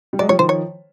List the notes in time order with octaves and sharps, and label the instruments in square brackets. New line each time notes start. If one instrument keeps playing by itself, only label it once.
[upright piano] G3
[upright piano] F#3 G#3 [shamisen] D5
[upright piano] F3 G3 [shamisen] C#5
[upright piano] D#3 F3 [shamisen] C5
[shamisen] C#5